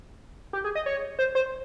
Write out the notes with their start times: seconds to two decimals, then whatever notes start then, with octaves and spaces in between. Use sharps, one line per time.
0.53 G4
0.64 G#4
0.75 D#5
0.86 C#5
1.19 C5
1.35 C5